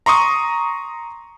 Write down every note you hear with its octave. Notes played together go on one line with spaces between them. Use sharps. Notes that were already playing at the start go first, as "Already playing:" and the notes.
A#5 C6 C#6 D#6